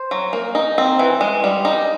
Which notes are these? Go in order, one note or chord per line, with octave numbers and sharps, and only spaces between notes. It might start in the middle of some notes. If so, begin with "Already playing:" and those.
Already playing: C5
F#3
A#3
D#4
C4
E3
G#3
G3
D#4